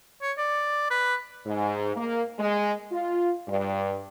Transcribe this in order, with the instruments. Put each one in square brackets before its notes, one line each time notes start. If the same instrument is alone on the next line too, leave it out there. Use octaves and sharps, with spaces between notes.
[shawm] C#5
D5
B4
[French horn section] G#2
A#3
G#3
F4
G2